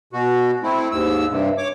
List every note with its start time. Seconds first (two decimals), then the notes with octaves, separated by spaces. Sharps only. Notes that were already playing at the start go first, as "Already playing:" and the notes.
0.13 B2 F#4
0.63 A3 C4 E4
0.92 D#2 G#2 E6
1.31 G2 C3
1.58 C#5 D6